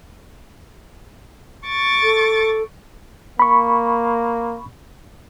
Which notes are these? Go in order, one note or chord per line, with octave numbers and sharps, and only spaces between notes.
C#6 D6 A6
A4
A#3 B5 C#6